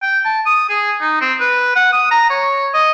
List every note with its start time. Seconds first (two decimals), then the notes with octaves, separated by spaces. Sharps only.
0.02 G5
0.25 A5
0.46 D#6
0.69 G#4
1.01 D#4
1.21 C4
1.40 B4
1.76 F#5
1.93 D#6
2.11 A#5
2.30 C#5
2.74 D#5